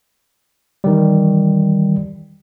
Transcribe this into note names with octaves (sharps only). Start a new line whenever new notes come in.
D#3 E3 G3